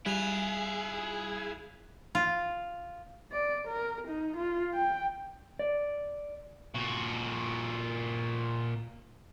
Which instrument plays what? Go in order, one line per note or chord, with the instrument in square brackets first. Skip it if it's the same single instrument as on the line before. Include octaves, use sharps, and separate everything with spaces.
[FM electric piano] G3 [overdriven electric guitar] E4 F4 [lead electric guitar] G#4 [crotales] F#6 E7 F7
[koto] F4
[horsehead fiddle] D5
A#4
D#4
F4
G5
[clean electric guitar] D5
[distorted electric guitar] A#2 F#4